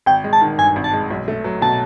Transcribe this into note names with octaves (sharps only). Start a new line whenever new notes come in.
G#1 G5
G#3
A5
D#3
G2 G#5
G#1
A5
G#3
B1
A3
F#3
B2 A5